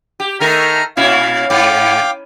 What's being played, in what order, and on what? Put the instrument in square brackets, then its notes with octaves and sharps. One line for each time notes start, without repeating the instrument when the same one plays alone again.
[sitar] G4
[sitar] D#3 A3 A#4 [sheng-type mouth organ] A#5 F6
[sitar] A#2 C#4 E4 [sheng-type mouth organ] F5
[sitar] G#2 [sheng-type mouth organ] F5 G5 D6